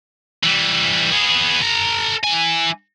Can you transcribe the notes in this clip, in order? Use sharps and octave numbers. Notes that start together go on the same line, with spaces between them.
E3 G3
B3 G#4
A4 A#5
E3 G#5